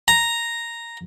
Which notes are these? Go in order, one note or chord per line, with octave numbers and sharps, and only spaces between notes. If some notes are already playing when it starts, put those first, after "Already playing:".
A#5